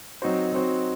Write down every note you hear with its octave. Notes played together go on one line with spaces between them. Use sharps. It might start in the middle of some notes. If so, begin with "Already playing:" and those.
F#3 C4 D#4 F#4 C5
F#3 C4 D#4 F#4 C5